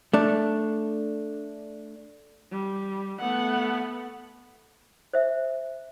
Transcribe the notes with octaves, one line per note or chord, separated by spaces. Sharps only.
A3 D4
G3
A3 B3 F#5
C5 E5